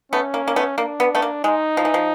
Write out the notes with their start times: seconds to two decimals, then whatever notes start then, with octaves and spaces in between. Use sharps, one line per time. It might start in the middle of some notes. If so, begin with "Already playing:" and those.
0.12 A3 B3 C#4
0.34 A#3
0.48 A#3
0.56 A3 B3
0.78 A#3 D4
1.00 B3
1.15 A3 B3
1.22 A#3
1.44 G#3 D#4
1.77 F3
1.85 E3
1.94 F3